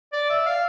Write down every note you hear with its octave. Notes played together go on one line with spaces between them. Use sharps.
D5
E5
F5